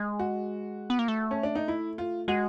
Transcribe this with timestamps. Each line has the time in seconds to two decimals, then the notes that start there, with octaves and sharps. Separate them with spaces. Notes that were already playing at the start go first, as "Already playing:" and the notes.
Already playing: G#3
0.19 F#4
0.90 B3
0.99 A#3
1.08 A3
1.31 C#4
1.43 D4
1.55 D#4
1.68 E4
1.98 F4
2.28 G#3 F#4